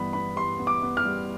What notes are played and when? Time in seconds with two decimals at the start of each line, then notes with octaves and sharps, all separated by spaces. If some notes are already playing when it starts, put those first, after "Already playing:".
Already playing: G2 E3 B3 B5
0.13 B3 B5
0.36 G3 C6
0.59 B3
0.67 D6
0.83 B3
0.97 F6
1.05 G3